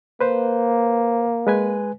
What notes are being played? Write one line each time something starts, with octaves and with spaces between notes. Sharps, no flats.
A#3 B4 C5
G#3 B4 G#5